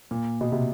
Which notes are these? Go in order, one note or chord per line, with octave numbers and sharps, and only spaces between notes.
A#2
B2
C3